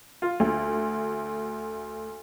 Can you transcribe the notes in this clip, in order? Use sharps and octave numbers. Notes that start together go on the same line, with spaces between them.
F4
D2